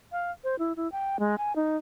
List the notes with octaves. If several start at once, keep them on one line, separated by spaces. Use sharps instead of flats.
F5
C5
E4
E4
G5
G#3
G#5
D#4